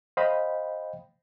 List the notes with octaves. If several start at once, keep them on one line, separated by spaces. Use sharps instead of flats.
C5 D#5 F5 G5 B5